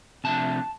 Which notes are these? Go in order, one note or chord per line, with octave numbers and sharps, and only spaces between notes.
C3 F3 A3 D4 A5